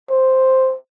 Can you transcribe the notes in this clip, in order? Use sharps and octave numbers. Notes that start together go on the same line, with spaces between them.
C5